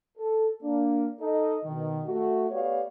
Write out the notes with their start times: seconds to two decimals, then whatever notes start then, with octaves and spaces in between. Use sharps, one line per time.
0.18 A4
0.62 A#3 D4
1.20 D#4 A4 D#5
1.64 B2 D#3
2.06 A3 F#4
2.51 A3 B3 G4 C#5 D5 F5